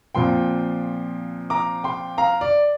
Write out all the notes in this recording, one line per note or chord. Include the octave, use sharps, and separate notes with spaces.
A#2 F3 C4 G5 C6
A#5 D6
G5 C6
F5 A#5
D5